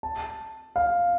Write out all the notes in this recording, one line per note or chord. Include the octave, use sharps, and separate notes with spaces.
A5
F5